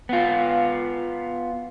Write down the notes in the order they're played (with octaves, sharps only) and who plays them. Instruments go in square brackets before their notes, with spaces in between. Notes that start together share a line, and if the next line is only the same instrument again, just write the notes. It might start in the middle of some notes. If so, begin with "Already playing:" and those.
[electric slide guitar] B3 F4